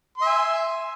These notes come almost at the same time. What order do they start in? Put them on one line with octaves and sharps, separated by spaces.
C6 E5 G#5